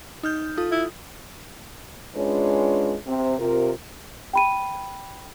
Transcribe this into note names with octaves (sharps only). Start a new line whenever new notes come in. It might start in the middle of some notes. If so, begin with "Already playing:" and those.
D#4 F6 G6
F4 A4 D#6
E4
G#3 C#4 D4 F4 B4 C#5
C3 C4
C3 F4 A#4
G5 B5 D#7